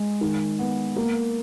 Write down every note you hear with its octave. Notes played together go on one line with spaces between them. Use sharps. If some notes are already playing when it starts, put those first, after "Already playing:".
Already playing: G#3
D#3
B3
A#3